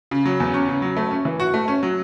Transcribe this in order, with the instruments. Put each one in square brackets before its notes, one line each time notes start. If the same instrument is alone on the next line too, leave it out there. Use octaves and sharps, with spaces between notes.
[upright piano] C#3
F#3
E2
C#4
C#3
F#3
A3
C#4
E3
F#4
A3
C#4
F#3